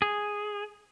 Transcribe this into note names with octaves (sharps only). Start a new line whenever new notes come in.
G#4